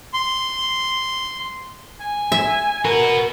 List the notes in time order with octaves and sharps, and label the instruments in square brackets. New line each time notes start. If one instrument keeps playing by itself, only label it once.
[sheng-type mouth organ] C6
[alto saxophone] G#5
[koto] E5
[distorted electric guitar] F#4 B4 [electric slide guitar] A#4